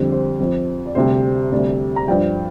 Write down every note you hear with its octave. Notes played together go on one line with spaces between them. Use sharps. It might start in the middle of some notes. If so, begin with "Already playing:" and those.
Already playing: F2 D3 G3
C5
F2 F3
D5
D2 C3 G3 C5
D2 C3 G3 D5
A#5
G2 F3 D5 G5